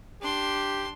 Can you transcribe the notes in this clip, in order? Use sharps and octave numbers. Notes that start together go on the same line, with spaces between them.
D4 G4 C6